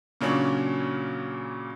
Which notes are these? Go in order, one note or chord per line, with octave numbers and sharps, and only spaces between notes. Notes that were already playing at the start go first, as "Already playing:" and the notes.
A#2 C#3 F#3 C#4 D4